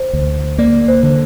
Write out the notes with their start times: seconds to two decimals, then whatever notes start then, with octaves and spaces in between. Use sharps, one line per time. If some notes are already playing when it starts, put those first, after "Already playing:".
Already playing: C5
0.13 D2
0.58 A#3 D5
0.88 C5
1.03 D3